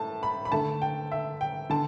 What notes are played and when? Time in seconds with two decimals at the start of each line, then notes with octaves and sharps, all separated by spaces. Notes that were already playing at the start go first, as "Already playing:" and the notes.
Already playing: A2 A5
0.23 B5
0.45 B5
0.52 D3 A3 A5
0.82 G5
1.11 E5
1.41 G5
1.70 D3 A5